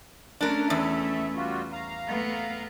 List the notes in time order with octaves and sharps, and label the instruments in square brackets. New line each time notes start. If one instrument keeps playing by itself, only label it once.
[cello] A3 C#4 [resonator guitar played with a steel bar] D4 A#4
[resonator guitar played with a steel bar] E2 [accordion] E5
[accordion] G3 F4 F#4
F5 A#5
[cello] A3 B3